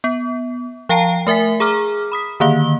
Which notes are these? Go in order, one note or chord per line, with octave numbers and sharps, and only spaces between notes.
B3
F3 F5 G5 A5 A#5 C7
A3 A#4 E5 G#5 B6
G#4 A#5 D6 F6
B5 D#6 B6
D3 D#3 A#3 G7